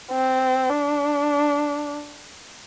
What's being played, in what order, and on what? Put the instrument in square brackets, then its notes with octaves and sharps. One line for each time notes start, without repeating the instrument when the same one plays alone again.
[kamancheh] C4
D4